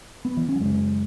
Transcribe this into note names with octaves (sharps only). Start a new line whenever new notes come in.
B3
E3
C#4
F#3
F#2 C#3 G#3